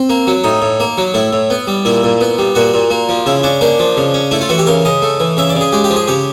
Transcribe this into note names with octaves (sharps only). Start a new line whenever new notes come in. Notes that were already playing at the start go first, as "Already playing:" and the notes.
Already playing: C4
A#3
F#3
A2 D#4
A2
A#3
F#3
A2 E4
A2
B3
G3
A#2 E4
A#2
B3
G3
A#2 F#4
A#2
A#3
F3
C#3 E4
C#4 D4
A#3 D4
F3
C#3
C#4
A3 E4
F4
E3 F#4
G4
C#3 A#4
C#3 D#5
A3
E3
C#3 E5
D5
C#3
G#4
G#3 G4
G4
F3
G#4
C#3 G4